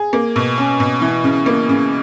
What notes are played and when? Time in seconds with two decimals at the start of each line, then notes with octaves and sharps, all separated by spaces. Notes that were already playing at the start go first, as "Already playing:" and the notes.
Already playing: G#4
0.13 A#3
0.36 B2
0.58 C#4
0.80 B2
1.02 E3
1.24 C#3
1.46 A#3
1.69 C#3